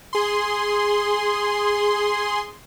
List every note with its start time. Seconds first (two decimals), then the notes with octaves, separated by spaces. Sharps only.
0.13 G#4 C6